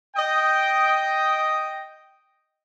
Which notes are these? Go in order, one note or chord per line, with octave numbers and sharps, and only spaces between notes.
D#5 G5